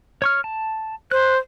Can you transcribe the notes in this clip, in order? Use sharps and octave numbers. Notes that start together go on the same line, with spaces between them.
C#5 C#6 F6
A5
C5 F#6